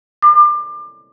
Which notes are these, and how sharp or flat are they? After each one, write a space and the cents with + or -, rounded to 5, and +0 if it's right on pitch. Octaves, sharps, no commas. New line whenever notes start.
D6 +30